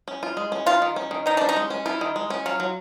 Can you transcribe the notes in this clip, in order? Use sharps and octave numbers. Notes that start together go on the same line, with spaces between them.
C#4
F4
G#3
C#4
D#3 F4
D#3
C#4
D#3
D#3 D#4
C#4 D4
D#4
G#3
C#4
E4 F4
D#3
G#3
C#4
F#3 F4
F#3